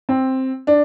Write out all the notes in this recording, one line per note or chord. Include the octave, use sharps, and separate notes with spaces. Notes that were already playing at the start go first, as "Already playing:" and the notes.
C4
D4